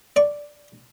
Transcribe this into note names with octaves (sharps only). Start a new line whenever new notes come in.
D5 C#6